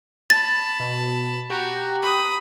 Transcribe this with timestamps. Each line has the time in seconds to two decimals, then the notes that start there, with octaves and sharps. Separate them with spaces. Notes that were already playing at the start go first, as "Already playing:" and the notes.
0.30 A5 B5 A6
0.80 B2
1.50 F#4 G4 G5 A#5
2.02 B5 D#6